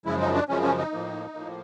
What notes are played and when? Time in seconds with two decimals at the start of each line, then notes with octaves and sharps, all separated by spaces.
0.05 F#2 C#3 F3 G#3 E4
0.20 D#4
0.34 D4
0.48 F#2 C#3 F3 G#3 C#4
0.62 C#4
0.78 D#4
0.92 A2 F3 A#3
1.34 A2 F3 A#3